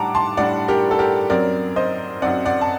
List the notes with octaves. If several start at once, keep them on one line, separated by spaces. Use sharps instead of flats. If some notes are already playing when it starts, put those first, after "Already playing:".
Already playing: A2 G3 D4 F#5 A5 A#5 D6
A5 C6
A2 G3 D4 D5 F#5
G4 A#4
A4
G4 A#4
F#2 F#3 C4 A#4 D5
C5 D#5
F#2 F#3 C4 D5 F#5
D5 F#5
A5